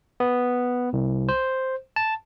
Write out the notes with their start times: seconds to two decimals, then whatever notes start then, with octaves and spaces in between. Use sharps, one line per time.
0.20 B3
0.93 C2
1.29 C5
1.96 A5